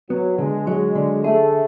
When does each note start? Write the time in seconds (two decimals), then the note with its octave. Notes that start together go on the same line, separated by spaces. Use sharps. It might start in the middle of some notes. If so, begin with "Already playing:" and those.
0.10 F#3 B3
0.38 D3 G#3
0.67 F#3 G#3
0.95 D3
1.24 A3 G#4